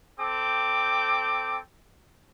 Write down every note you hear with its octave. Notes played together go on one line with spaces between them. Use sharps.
C4 A4 G5 D6